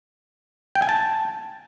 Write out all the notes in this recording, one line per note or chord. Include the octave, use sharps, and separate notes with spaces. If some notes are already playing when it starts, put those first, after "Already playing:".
G5
G#5
A5